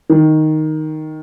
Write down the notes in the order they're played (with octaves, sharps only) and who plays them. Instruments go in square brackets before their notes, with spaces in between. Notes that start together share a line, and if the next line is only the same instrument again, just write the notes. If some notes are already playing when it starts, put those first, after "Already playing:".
[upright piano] D#3